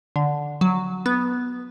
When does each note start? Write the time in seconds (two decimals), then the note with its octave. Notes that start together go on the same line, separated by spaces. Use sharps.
0.16 D3
0.61 F#3
1.06 B3